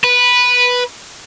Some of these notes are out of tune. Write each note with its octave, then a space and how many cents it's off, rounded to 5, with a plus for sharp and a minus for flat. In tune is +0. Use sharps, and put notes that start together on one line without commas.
B4 -5